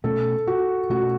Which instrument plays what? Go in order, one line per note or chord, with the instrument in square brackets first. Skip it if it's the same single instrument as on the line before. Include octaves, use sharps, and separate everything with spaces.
[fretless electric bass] B2 A3 C#4 [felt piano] A4
[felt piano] F#4
[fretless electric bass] B2 A3 C#4 [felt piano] F#4